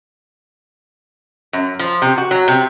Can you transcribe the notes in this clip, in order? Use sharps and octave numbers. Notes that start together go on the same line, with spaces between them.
F#2
F3
C3
F#4
F#3
C3